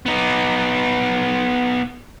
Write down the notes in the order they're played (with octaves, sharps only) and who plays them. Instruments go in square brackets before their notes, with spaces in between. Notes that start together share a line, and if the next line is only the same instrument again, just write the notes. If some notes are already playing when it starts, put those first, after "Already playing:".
[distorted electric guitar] B3 D#4